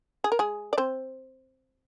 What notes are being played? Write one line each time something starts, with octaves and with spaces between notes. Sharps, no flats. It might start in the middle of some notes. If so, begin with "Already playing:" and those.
G#4
A#4
G#3 G#4
D5
C4 C5